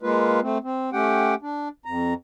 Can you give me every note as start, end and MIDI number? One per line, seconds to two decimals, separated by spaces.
0.02 0.40 56
0.02 0.40 58
0.02 0.40 65
0.02 0.40 71
0.43 0.58 57
0.43 0.58 60
0.64 0.90 60
0.93 1.35 57
0.93 1.35 61
0.93 1.35 67
0.93 1.35 78
0.93 1.35 79
1.42 1.69 62
1.86 2.14 41
1.86 2.14 82